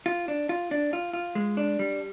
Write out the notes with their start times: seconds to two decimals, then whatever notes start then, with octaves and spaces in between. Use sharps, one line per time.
0.06 F4
0.28 D4
0.49 F4
0.71 D4
0.93 F4
1.13 F4
1.35 G#3
1.57 D4
1.79 G3